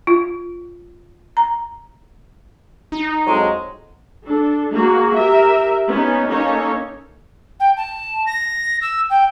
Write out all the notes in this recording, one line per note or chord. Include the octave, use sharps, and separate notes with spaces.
F4
A#5
D#4
F2 F#3 G#3
D4 A4
A#3 F#4 G#4
G4 A#4 E5
B3 C#4 D#4
A#3 C#4 D#4 A4 C#5
G5
A5
A#6
E6
G5